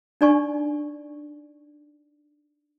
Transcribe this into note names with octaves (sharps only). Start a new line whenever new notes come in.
D4 D#4 D5 G#5 A#5 C#6